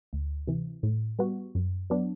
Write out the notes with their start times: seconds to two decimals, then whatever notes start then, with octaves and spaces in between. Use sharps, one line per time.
0.13 D2
0.47 C3 E3
0.83 A2
1.19 G3 B3 F#4
1.55 F#2
1.90 F#3 B3 D4